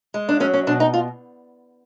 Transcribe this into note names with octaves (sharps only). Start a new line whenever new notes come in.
G#3
D4
F#3 C#4
C#4
B2 D4
D#4
F4